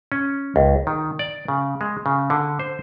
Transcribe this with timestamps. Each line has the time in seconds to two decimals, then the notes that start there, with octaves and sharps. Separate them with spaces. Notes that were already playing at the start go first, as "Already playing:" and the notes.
0.12 C#4
0.56 C#2
0.87 D#3
1.19 D5
1.48 C#3
1.81 G#3
2.06 C#3
2.30 D3
2.59 C5